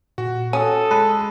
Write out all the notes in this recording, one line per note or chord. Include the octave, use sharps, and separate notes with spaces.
A#2 F#4
C#4 F#4 A4 D#6 D#7
G#3 A5 B5 F#6 D#7